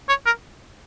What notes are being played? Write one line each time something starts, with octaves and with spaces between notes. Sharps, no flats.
C#5
A#4